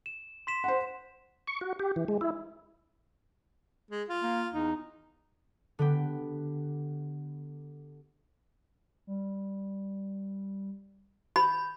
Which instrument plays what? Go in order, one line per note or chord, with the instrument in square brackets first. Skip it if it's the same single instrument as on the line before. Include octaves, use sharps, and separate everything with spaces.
[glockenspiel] E7
C6 B6 E7
[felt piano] C5 F#5
[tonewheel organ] C#6
F#4
G4
E3
G#3
E4
[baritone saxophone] G#3
F4
[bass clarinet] A#3
[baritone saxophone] E2 [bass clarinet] D#4
[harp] D3 B3 G4
[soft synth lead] G3
[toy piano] B5 [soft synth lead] G6